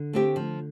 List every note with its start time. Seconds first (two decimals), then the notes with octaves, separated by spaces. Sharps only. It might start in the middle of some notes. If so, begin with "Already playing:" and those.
Already playing: D3
0.13 A3 C4 G4
0.36 F3